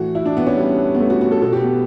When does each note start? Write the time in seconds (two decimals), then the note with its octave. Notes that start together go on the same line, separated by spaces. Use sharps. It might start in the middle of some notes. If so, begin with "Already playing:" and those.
Already playing: A2 E3 F#4
0.15 E4
0.26 D4
0.37 B3
0.47 C#4
0.57 G3
0.95 B3
1.00 A3
1.10 F#4
1.21 F#4
1.31 A4
1.42 B2 A4
1.53 G4
1.63 B3